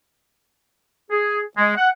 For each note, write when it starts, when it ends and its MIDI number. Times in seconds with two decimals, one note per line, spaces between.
1.11 1.42 68
1.58 1.75 56
1.76 1.90 78